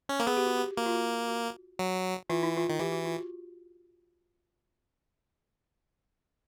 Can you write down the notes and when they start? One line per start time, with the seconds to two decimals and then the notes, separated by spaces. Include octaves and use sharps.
0.09 C#4
0.20 A#3
0.27 B3 G#4
0.37 G4
0.46 F#4
0.57 G4
0.77 A#3 F#4
0.86 F4
0.95 F#4
1.28 F#4
1.79 F#3
2.29 E3 F4
2.43 E4
2.57 F4
2.69 D#3
2.80 E3 G4
2.92 F#4
3.05 F4
3.17 F#4